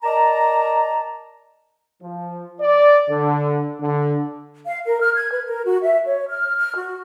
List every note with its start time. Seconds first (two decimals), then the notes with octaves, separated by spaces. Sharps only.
0.03 A#4 D5 D#5 A5 A#5
2.02 F3
2.61 D5
3.10 D3
3.80 D3
4.66 F5
4.85 A#4
5.00 F6
5.14 G#6
5.31 B4
5.44 A#4
5.64 F#4
5.83 E5
6.06 C#5
6.28 F6
6.56 F6
6.76 F#4